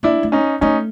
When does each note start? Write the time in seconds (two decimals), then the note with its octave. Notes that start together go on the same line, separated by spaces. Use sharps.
0.03 A#3 D4 E4
0.23 A3
0.32 C#4 D#4
0.61 A3 C#4 D#4